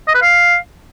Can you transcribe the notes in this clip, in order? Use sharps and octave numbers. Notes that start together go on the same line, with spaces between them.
D#5
B4
F5